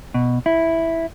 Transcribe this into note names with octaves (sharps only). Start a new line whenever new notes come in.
B2
E4